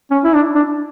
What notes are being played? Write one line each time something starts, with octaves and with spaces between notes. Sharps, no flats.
C#4
E4
D4
D4